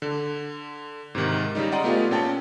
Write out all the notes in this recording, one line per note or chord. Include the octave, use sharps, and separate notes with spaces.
D3
G#2 C3 D#3
C#3 G3 D#4
D5 D#5 F#5 G5 A#5 C6
A3 B3 F4 G4 G#4 D5
A#2 C#4 G5 A5